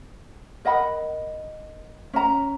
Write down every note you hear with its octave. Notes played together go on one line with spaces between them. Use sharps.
A#4 D#5 F#5 B5
C#4 A#5